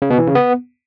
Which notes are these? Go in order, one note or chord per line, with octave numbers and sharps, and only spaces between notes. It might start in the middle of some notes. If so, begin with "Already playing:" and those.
C#3
B2
E3
C#3
B3